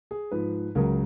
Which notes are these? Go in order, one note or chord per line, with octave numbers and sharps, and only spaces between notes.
G#4
G#2 F3 B4
C#2 C#3 F#3 A#4